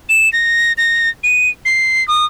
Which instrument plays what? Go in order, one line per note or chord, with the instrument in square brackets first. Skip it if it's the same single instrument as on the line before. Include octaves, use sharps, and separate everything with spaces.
[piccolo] E7
A#6
A#6
D#7
C7
D#6